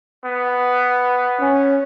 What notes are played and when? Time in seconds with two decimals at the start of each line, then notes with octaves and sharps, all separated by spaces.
0.24 B3
1.39 C#4